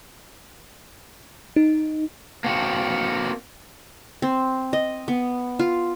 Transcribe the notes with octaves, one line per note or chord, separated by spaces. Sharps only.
D#4
A#3 C4 F#4
C4
D#5
B3
F4